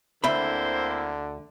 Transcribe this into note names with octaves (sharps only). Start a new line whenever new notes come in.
D2 D3 A#3 C4 E4 C5 E5 B5